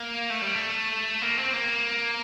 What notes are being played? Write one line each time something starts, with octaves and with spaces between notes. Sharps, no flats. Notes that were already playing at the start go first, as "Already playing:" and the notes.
Already playing: A#3
A3
G3
A3
A#3
C4
A#3